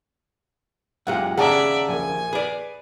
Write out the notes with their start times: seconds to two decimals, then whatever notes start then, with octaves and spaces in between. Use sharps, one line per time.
1.07 F#2 A#2 G#3 G4 F5 F#5
1.37 D#2 C#3 G#4 D5 E5 F#5 A5 A#5
1.88 A#1 A#4 G#5
2.33 G#4 B4 D5